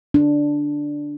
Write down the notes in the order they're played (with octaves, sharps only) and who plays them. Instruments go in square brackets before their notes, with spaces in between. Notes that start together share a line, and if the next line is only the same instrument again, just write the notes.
[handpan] D4